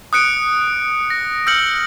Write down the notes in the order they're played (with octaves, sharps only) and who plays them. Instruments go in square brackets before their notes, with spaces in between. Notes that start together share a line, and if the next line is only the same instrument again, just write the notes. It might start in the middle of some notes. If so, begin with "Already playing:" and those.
[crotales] D#6 F#6 C#7 D7
A#6
E6 F6 G6 A#6 C#7 F#7